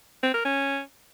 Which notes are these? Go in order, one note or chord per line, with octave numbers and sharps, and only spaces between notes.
C4
A#4
C#4